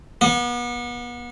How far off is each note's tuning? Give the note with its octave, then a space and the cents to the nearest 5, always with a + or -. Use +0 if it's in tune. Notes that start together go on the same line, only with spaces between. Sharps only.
B3 -35